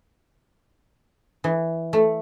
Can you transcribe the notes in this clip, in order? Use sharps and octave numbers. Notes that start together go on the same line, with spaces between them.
E3
A3